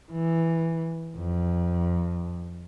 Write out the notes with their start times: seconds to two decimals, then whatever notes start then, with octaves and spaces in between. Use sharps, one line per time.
0.12 E3
1.18 F2